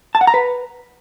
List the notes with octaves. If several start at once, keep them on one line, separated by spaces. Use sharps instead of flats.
A5
F#5
A#5
B4